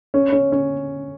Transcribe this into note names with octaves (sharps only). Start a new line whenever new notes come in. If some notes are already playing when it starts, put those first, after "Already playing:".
C#4
C#4
C#4